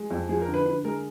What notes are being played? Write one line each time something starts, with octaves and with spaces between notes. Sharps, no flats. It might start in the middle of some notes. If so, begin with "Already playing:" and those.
Already playing: G#3
F2
F3 G#4
A#4
D3
B4
D3 B4
G#3 A#4